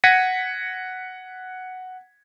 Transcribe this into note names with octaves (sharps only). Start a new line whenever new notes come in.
F#5 G#6 A#6 B6 C#7 D#7